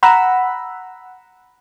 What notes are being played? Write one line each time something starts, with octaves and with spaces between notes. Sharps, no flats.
F#5 A#5 B5 E6